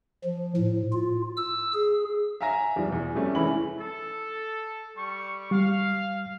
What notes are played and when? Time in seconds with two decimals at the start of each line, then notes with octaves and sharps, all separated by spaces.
0.24 F3
0.57 A2
0.93 F4
1.37 E6
1.74 G#4
2.41 E5 F5 G#5 A#5 A#6
2.76 E2 G#2 F3 G3
2.89 E2 B2
3.15 C3 G3 A3 C#4
3.35 E3 G#3 C#4 E4 B5 F#7
3.78 A4
4.97 G3 C#6
5.51 G3 F5